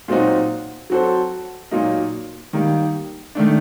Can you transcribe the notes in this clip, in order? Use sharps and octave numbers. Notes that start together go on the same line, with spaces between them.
A#2 F#3 C4 D#4 F#4
F#3 C4 F#4 A4 C5
A#2 F#3 A#3 D#4
D#3 G3 A#3
D#3 A3 D4